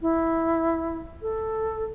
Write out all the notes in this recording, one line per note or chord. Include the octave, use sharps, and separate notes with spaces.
E4
A4